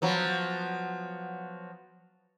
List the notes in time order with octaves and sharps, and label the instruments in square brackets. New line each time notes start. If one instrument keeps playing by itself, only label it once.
[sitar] F3 F#3 B3